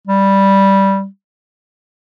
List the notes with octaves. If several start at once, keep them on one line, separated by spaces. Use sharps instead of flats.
G3